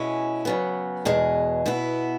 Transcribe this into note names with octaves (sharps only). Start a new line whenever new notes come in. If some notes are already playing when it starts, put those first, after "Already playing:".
Already playing: B2 G#3 C#4 E4
F#2 C#3 F#3 B3
E2 B2 G#3
B2 B3 E4